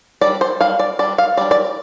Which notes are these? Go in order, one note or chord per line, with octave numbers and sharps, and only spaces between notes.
G3 D4 D5
C5
G3 D4 F5
D5
G3 D4 D5
F5
G3 D4 D5
D5